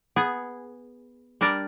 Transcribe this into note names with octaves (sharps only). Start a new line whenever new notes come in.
B3 G#4
G3 D4 A#4 D5